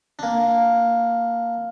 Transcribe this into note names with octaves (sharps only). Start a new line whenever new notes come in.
A#3 D4